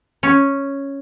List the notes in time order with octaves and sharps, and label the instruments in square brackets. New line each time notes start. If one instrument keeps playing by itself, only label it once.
[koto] C#4